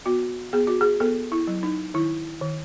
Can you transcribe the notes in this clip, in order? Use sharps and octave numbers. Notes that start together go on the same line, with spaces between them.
B3 F#4
B3 G#4
F#4
G#4
B3 A4
E4
F#3
D#4
D#3 E4
D#3